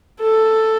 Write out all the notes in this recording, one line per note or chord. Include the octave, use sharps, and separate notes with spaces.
A4